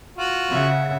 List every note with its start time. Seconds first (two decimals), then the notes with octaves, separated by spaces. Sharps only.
0.17 F4 F#4
0.52 C#3 E5 F#5